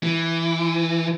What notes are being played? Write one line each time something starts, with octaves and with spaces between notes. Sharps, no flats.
E3